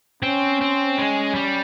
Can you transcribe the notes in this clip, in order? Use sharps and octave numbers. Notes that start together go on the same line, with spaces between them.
C4 C#4
C4
G#3
G3